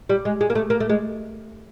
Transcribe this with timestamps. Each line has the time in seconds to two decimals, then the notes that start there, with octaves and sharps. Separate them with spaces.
0.09 G3
0.25 G#3
0.41 G#3
0.50 A#3
0.55 A3
0.70 A#3
0.80 A3
0.90 G#3